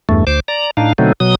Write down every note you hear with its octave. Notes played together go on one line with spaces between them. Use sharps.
E2 G2 A3
D2 C5 D6
D5 A#5
A2 D4 D#4 F5
B2 D3 F#3 A3 C4 D#4
B2 F#3 D#6